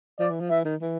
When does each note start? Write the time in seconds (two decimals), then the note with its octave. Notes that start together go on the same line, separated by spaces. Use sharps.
0.19 F3 D5
0.30 E3
0.40 F3
0.50 E3 E5
0.65 D#3
0.81 E3